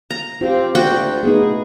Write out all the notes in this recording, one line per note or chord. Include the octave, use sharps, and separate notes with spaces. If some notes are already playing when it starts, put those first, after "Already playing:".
A#5
C4 F4 G4
D2 F#4 F#5 G5
A3 B3 D#4 G#4